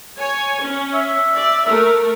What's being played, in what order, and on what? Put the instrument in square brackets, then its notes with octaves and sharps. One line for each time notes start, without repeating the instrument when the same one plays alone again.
[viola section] C#5 G#5
C#4
[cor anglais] E5
[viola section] D5
A3 A#4